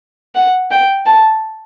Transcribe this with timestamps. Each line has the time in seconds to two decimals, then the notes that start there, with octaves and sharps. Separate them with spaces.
0.35 F#5
0.71 G5
1.06 A5